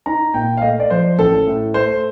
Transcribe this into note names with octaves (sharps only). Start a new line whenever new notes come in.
D#4 A#5
A#2 G5
F5
A3 D#5
D5
F3 C5
A1 A4
A2
A3 C5